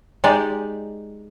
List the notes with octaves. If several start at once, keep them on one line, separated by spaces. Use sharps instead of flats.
G#3 D#4 G4 D5